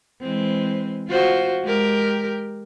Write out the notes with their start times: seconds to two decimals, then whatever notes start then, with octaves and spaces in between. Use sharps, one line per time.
0.21 E3 G#3 C4
1.08 F4 F#4 C5
1.63 G#3 G4 A#4